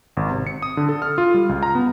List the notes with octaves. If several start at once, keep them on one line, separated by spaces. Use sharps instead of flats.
G#1
C3
C#7
D#6
D3
A4
F6
F4
G3
C#2
A#5
B3